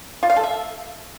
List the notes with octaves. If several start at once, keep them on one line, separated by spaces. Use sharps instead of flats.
F4
F5
A4
E5